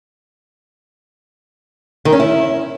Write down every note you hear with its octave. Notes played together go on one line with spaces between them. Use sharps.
D#3
C#4
E4